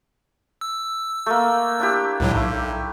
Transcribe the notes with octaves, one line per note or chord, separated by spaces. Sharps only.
E6
A3 A#3
D4 E4 G4
C#2 A2 F#3
B1 E4